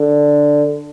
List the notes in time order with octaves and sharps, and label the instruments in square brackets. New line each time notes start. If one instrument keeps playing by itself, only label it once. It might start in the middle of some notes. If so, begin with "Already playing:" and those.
Already playing: [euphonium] D3